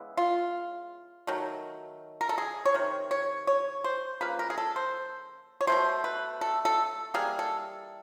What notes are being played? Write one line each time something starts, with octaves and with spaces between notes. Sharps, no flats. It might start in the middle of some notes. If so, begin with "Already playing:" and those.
Already playing: C#3 E3 G#3 B3
F4
D#3 F#3 A3
A#4
A4
G#4
C#5
C3 D#3
C#5
C#5
C5
C#3 F3 A#3 B4
A#4
G#4
A4
C5
C#5
B2 F#3 A3 C5
B4
A4
A4
E3 G3 A#3 G#4
A4